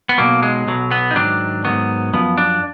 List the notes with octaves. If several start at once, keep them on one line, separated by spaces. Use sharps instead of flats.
B3
B1 B2 F#3 A#3
G#3
B1 B2 F#3
B3
D#4
G#2 D#3 F#3 D4
G#2 D#3 F#3 B3
F#2 F3 B3
D4